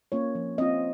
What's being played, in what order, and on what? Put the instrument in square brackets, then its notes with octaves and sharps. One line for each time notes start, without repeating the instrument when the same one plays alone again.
[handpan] A#3 C#4 F4 C#5
F3
C4 F4 D#5